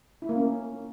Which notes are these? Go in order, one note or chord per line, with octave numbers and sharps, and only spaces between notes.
E4
A#3
C#4